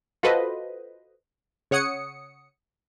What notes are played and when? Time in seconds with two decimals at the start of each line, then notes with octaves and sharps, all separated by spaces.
0.23 F4 F#4 A4 B4 C5 D#5
1.71 C#3 C#5 F#5 D#6 C#7